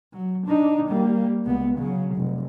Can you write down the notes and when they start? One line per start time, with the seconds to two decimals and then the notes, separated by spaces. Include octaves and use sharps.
0.13 F#3
0.47 D4 D#4
0.89 G3 A#3
1.45 C#2 B3
1.78 C#3 F#3
2.16 F1